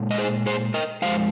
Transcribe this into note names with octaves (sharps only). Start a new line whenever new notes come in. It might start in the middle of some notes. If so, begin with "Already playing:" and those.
Already playing: A#2 G#3
D#5
G#4 C5
G#4 C5
A#4 D#5
F2 F3 G#3 C5 F5